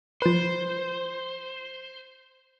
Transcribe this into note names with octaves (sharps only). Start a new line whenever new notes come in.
F3 B4 C5